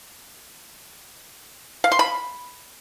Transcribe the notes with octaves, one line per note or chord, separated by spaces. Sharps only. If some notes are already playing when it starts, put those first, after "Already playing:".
F5
C6
B5